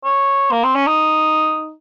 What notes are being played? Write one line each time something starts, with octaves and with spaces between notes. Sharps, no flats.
C#5
A#3
C4
C#4
D#4